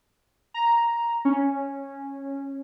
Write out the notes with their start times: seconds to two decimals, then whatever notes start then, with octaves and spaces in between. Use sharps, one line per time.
0.54 A#5
1.25 C#4